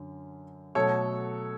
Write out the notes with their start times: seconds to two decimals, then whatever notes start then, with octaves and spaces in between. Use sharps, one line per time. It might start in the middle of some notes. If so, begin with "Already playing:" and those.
Already playing: F#2 D3
0.75 B2 F#3 A3 A4 C#5